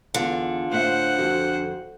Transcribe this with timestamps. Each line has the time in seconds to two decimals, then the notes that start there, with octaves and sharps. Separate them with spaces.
0.14 E2 D3 F4
0.71 A2 C5 E5 F#5
1.18 F2 F#4